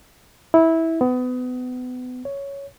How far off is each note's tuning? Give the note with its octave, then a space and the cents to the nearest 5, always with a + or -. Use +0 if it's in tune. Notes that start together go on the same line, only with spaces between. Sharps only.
E4 -15
B3 +30
C#5 +5